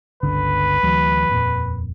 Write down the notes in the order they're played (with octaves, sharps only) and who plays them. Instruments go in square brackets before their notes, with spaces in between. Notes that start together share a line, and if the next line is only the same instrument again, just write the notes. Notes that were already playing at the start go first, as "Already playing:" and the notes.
[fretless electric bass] G1 C#2 D3 [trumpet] B4
[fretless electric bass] D2 E3 F#3
D#1 F2 A#2